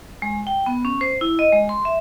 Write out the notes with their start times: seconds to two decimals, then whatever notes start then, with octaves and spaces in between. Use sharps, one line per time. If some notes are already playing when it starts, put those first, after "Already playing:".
0.22 G#3
0.47 G5
0.66 B3
0.85 C#4
1.01 C5
1.21 E4
1.39 D#5
1.52 G#3
1.69 C6
1.85 E5